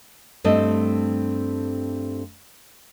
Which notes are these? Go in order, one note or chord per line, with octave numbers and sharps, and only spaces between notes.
G2 A3 C4 D#5